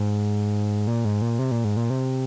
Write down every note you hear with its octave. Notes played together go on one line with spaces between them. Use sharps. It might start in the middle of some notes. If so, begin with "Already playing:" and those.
Already playing: G#2
A#2
G#2
A#2
C3
A#2
G#2
A#2
C3